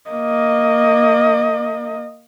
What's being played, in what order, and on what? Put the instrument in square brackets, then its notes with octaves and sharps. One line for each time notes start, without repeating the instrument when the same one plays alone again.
[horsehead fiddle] A#3 D#5